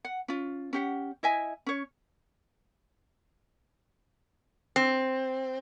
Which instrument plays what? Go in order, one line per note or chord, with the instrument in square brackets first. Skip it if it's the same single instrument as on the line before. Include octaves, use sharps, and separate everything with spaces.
[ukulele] F#5
C#4 F4
C#4 G4 F#5
E4 D#5 E5 G#5
C#4 C#5
[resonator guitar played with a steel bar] C4